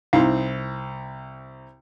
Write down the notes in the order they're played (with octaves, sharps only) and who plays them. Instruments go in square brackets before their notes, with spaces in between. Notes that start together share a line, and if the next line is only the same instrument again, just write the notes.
[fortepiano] C2 C4 [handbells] D#4 E4 F5